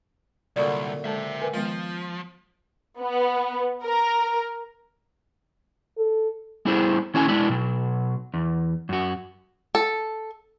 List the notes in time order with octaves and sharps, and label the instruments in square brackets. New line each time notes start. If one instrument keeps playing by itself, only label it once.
[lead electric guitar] C2 [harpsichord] F#2 A#2 D3 [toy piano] D5 C#6
[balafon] G#3 A4 A5 [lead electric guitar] C5 E5
[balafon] A#4 B4 G#5
[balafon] D#3 G#3 B3 [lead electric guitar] F3 [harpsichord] F4
[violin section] B3
A#4
[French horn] A4
[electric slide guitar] G3 B3 E4 G#4 A4 C5
D#3 C#4 E4 A4 F5 G#5
G#3 B3 D4 E4
B2 F#3
E2
F#2 F#4
[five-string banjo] A4